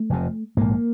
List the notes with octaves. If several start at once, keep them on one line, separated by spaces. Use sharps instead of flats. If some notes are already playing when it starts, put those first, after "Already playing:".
Already playing: A3
F1 F2 C3
A#1 G#2 A#3